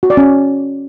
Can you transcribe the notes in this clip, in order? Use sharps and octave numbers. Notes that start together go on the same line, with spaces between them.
F#4
D5
C#4